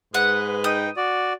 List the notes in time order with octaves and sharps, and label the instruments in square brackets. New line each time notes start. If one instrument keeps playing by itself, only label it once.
[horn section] G#2 G#3 B4 [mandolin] F#5
[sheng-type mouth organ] D#4 G5 [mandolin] D#6
[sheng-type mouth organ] F#4 D5